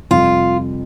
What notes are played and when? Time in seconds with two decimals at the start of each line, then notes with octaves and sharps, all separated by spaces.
0.11 F2 C3 G3 F4